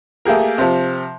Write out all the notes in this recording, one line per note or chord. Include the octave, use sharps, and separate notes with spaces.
A3 A#3 G4 G#4 A#4
C3 F3